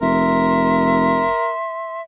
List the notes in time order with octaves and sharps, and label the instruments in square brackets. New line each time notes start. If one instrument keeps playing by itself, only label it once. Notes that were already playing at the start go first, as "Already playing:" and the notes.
[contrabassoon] F1 [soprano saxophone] A#4 [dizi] E5 [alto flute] C6